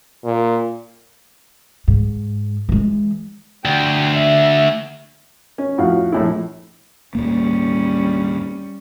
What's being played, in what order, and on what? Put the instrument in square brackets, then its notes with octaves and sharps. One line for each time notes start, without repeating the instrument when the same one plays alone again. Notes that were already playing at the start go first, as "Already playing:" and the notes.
[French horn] A#2
[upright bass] G#2
E3 G#3
[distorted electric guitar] D2 [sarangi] G5
[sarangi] E5
[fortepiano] C#4
F2 A2 F#4 F5
A#1 A2 E4
[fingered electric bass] D#2 A2 A#3 [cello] G3 C#4